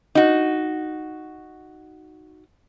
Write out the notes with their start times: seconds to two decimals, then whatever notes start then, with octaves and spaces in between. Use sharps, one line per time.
0.15 D#4 F#4